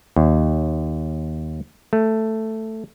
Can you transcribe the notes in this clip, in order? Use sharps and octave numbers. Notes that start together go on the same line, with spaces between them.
D#2
A3